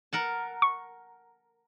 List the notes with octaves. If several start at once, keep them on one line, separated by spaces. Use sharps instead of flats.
A#4 F#5 A5
C#6